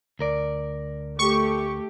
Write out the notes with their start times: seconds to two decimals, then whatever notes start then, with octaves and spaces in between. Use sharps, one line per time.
0.19 D2 A#4 D5
1.19 A3 G4 C#6